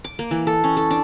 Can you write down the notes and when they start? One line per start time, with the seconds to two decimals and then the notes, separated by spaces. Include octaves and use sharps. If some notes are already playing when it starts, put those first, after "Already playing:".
0.04 D6
0.19 A#3
0.31 E3
0.47 A4
0.64 C#4
0.77 A4
0.91 D4